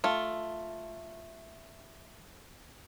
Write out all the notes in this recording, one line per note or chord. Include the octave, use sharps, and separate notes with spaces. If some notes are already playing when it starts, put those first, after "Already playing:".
A3 F4